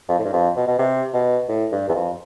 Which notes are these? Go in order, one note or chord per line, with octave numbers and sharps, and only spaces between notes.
F2
A2
G2
F2
B2
B2
C3
B2
A2
G2
E2
F2